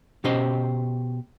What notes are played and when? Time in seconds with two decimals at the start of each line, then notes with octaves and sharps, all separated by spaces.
0.24 B2 C#4 G4 C5 D#5